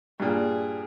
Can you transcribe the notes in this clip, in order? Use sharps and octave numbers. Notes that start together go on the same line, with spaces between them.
G2 A#2 G#4